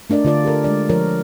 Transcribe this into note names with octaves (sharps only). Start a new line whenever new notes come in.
A3 D4 A#4 D5 D#5
D3 F4 D5
G4 A4 A#4
G#3 D4 D5
F3 A#4 C#5